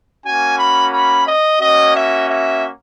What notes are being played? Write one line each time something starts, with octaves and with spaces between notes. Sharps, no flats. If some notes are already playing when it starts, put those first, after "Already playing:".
A#3 C#4 F#4 G#5
B5
B5
D#5
A#3 C#4 F#4 D#5
E5
E5